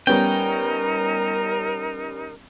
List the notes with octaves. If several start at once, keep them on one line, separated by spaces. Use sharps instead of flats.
G3 B3 C#4 D#4 A#4 G5